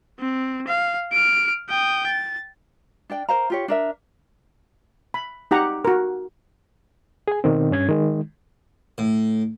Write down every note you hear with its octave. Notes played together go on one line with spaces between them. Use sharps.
C4
F5
F6 D7
G5 D#6
A6
D4 D5 G5
A#4 C5 F5 A#5
F4 G4 C#5
D4 A#4 E5
B5
D#4 G4 F#5 A#5
F#4 A#4
G#4 G#5
B2 D#3 C4
G2 C#4 G#6
D#3 G#3
A2